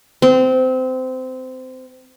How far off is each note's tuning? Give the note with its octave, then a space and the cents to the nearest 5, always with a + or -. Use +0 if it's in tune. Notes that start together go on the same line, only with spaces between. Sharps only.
C4 -20